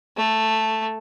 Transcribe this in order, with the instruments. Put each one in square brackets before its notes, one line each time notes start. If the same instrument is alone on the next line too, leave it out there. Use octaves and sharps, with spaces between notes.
[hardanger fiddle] A3